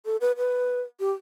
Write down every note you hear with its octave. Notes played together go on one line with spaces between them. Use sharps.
A4
B4
B4
G4